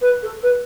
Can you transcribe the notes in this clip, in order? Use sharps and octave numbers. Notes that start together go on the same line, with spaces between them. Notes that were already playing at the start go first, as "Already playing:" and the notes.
B4
A4
B4